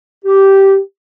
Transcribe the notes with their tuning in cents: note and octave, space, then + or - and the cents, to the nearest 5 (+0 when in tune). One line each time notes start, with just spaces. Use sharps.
G4 -10